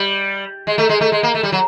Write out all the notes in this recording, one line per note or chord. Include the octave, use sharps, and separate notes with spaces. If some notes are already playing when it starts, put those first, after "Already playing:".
Already playing: G3
G#3
A3
G#3
A3
G#3
A#3
A3
G3
F#3